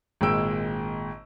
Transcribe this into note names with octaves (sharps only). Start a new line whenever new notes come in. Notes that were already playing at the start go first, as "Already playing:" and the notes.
G#1 A#2 G#3 G5 E6 D7